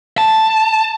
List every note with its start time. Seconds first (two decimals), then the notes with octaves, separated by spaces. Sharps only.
0.18 A5